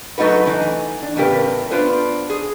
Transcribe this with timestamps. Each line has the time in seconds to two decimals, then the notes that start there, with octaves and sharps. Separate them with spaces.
0.18 F#3 A3 D#4 F#4 B4
0.46 E3 D#4
1.03 D4
1.16 E2 A2 C#3 G4 A#4 B4
1.71 B3 D4 F4 B4 C5
2.30 G#4